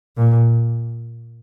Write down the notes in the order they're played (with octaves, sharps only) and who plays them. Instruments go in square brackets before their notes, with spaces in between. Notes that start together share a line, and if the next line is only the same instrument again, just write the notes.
[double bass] A#2